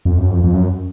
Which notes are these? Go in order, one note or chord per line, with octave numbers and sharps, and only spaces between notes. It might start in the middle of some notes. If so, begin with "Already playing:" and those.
F2
F#2
F2
F2
F#2